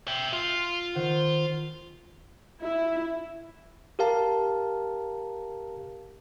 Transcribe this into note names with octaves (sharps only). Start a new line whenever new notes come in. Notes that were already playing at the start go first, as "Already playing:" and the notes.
E5 G5
F4
D#3 C5 F#5
E4
G4 A#4 F5 A5